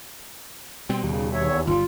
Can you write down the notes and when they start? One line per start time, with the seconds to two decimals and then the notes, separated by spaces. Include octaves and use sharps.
0.89 B2 G3 C4
1.03 D#2 C#3
1.33 E2 C#5 E5
1.67 G1 G3 F4